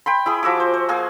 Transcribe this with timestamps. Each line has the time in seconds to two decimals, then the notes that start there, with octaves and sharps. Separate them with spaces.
0.06 G5 B5 C6
0.26 E4 G#4 D#6
0.43 F3 F#4 E5 D6
0.60 C5
0.74 C5
0.89 A#3 G#4 G#5